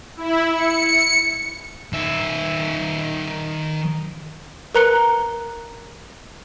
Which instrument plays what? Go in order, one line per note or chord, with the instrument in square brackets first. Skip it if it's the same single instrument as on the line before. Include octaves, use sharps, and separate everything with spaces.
[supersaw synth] E4
C#7
[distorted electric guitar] D#3 E5
[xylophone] A#4 B4 A#5 F#6 C#7 G7